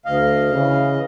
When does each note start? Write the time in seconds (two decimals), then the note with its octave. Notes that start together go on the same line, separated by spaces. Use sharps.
0.05 D2 D#5 F5
0.50 C#3 E3